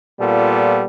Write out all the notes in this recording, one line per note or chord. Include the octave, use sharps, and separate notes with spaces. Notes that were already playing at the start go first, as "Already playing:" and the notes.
A#2 G3 B3 F4 A4